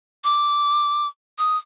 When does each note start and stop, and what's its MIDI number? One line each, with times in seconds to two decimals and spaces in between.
0.24 1.07 86
1.38 1.57 87